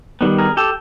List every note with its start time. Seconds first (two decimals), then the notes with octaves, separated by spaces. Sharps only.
0.21 D#3 G3 B3
0.38 G#4 A#4
0.57 G4 A4